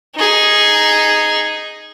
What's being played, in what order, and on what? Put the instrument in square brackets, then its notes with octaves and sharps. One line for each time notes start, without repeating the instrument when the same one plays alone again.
[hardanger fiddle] D#4 G#4